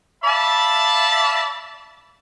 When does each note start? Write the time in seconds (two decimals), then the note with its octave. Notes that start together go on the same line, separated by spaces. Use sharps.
0.24 D5 E5 F5 A5 B5